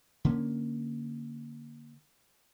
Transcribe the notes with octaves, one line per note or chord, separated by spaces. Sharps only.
D3 A#3 C#4